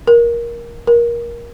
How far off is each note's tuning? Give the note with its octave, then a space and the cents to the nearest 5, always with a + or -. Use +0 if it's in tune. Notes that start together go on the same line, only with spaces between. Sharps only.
A#4 +15
A#4 +20